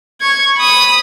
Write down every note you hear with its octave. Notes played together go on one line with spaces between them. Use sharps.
C#6 G#6
B5 D#6